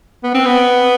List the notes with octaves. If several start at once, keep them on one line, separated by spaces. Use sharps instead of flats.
B3
C4
B3